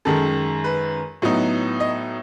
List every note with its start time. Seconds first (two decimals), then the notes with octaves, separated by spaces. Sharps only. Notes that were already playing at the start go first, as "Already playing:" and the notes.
0.05 F#2 D#3 G#3 A4
0.64 B4
1.22 A2 F#3 B3 D#4
1.80 D#5